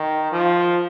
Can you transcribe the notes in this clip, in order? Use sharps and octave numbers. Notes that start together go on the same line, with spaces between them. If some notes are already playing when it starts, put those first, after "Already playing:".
Already playing: D#3
F3